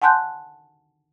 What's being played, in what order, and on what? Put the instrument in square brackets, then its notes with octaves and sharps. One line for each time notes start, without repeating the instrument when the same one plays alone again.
[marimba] F#5 G#5 A5 C6 F#6 G6